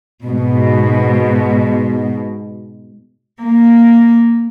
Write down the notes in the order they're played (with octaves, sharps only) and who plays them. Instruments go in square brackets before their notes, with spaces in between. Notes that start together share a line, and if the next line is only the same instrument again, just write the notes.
[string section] G#2 B2
[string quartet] A#3